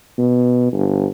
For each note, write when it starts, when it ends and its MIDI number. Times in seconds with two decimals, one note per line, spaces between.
0.18 0.70 47
0.73 1.06 31